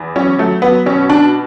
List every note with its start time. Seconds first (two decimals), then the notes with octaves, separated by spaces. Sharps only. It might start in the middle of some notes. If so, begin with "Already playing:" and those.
Already playing: E2
0.16 F#3 C#4
0.39 F#3 A3
0.62 F#3 B3
0.86 B2 C#4
1.09 B2 D4